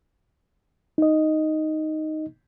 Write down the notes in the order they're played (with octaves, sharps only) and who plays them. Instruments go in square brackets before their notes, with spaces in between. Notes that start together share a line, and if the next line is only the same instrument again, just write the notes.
[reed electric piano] D#4 D#5